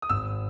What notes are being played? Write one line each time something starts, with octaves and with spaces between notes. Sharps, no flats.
D#6
G#1 E6